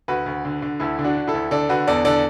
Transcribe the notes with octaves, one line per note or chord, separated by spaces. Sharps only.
D2 F#4 B4
D2
D3
D3
D2 E4 A4
D3
D4 F#4
D3
E4 A4
D2
D3 A4 D5
D3 F#4 B4
E2 A4 D5
D3 A4 D5